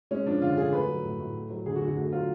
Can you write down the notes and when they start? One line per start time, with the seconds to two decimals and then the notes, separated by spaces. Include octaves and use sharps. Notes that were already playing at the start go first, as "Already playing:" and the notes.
0.11 G#3 C#4
0.26 F3 D4
0.42 D3 F4
0.57 D3 G#4
0.73 A3 B4
0.88 F#3
1.04 A2
1.19 A2
1.35 A3
1.50 F#3
1.66 D3 G#4
1.76 F#4
1.81 D3
1.87 F#4
1.97 A3 F#4
2.12 F#3 F4